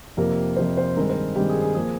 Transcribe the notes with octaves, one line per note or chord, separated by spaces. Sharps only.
F2 C3 F3 A#3 A#4
F2 C3 F3 A#3 C5
C5
G2 D#3 G#3 C4 A#4
C5
G2 D#3 G#3 C4 G4
G#4
G#4
F3 A#3 G#4